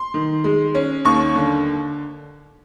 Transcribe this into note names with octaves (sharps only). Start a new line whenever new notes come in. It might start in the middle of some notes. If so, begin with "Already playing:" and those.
Already playing: C6
D#3
G#3
C#4
D#2 C#6
D3